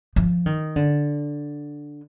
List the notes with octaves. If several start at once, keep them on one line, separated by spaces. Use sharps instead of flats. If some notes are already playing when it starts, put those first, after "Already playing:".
F3
D#3
D3